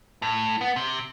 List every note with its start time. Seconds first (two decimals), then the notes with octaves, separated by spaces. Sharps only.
0.22 A2
0.61 B3
0.76 C3